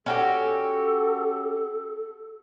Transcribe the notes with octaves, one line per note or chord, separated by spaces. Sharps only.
C#4 F#4 G4 A4